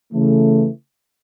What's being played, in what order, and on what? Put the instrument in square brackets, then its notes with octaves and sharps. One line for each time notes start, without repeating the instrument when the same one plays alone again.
[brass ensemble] C#3 E3 A3